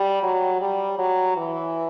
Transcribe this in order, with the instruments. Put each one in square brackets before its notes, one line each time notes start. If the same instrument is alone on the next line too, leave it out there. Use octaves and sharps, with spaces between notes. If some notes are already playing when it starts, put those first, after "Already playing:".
Already playing: [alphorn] G3
F#3
G3
F#3
E3